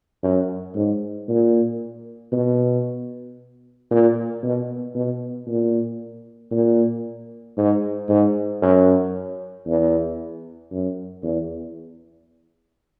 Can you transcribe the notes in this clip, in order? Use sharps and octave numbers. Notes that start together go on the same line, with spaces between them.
F#2
G#2
A#2
B2
A#2
B2
B2
A#2
A#2
G#2
G#2
F#2
E2
F#2
E2